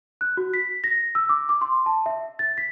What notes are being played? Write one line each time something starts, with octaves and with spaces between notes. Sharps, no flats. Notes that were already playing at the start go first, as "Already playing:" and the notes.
F#6
F#4
B6
A#6
E6
D6
D6
C6
A5
E5
A6
B6